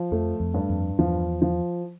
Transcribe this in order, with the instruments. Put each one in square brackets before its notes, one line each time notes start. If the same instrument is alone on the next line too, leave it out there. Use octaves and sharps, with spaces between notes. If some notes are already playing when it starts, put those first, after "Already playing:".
Already playing: [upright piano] F3
[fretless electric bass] F2 [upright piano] A3
[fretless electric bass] F2
[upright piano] G2
[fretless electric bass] F2
[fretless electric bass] E2 [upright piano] F3
[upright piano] F3